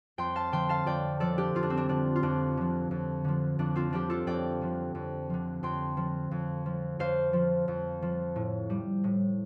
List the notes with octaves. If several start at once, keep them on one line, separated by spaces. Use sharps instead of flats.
F2 G5 C6
F5 A5
D3 F3 G5 C6
F5 A5
F2 D5 G5
D3 F3 A4 D5
D4 G4
F2 F4
D4
C4
D4
D3 F3 D4
F4
F2 D4
D3 F3
F2
D3 F3
F2 D4
C4 F4
D3 F3 D4 G4
F4 A4
F2 D5 G5
D3 F3
F2
D3 F3
F2 G5 C6
F3
F2
F3
F2 C5 F5
F3
F2
F3
A2
G3
A2